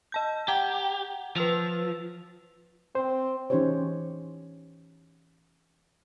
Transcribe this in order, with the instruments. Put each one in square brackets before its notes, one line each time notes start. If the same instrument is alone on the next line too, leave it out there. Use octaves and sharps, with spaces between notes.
[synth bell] D#5 A5 G6
[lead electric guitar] G4 [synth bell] F#5 G5 A#5
[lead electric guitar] F3 [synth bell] B4 E6 F7
[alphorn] C4 [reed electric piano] C5
[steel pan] E3 C#4 D#4 G4 C5 C#5